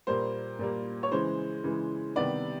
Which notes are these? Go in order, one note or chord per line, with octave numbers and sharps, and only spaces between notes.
A#2 G3 A#3 C5
A#2 G3 A#3
C#5
C#3 E3 G#3 C5
C#3 E3 G#3
C3 D#3 G3 B3 D5